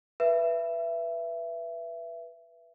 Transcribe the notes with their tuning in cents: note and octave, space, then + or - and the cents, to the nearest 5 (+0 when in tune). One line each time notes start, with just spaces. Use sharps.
B4 -5 E5 +20